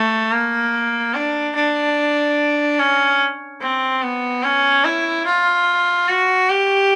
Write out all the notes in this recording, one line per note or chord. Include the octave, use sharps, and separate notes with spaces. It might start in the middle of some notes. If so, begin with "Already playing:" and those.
Already playing: A3
A#3
D4
D4
C#4
C4
B3
C#4
E4
F4
F#4
G4